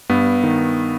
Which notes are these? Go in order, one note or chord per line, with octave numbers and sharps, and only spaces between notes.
G2 B3
D#3